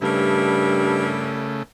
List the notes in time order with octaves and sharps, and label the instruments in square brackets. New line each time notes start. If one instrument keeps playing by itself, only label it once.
[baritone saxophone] G2 [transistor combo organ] C#3 A3 [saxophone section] G3 E4 A#4